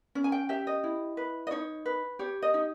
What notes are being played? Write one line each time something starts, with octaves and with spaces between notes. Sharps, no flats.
C#4
G#5
G5
G4 E5
D#5
E4
B4
D#5
D#4 C#5
B4
G4 C#5
D#5
D#4